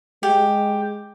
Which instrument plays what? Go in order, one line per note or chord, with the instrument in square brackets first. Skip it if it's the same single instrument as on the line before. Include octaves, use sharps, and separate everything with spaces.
[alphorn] G#3 [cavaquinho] G4